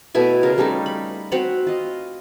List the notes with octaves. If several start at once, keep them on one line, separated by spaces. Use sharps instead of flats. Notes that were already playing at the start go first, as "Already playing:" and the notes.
B2 A3 E4 G#5
C#3 F4 A#4
G3 A3 C#4 D#4
B5
C4 F#4 C#5 B5
F4 D#5